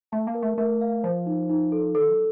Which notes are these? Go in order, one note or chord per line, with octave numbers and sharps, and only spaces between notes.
A3 A5
A#3
A#4
A3
A3 A#4
F5
F3 C5
D#4
D#4
A4
D#3 A4
F#3